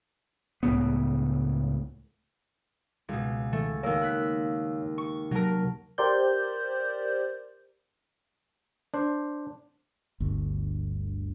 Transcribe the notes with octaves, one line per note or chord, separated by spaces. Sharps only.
C#2 A2 C#3 B3
C#2 B2
D#3 A3
D#2 A#3 C#5 F5 E6
F#6 B6
C#6
C3 F#3 A#4 A5
G4 A#4 C5 D5 G6
D4 C5
G1 D2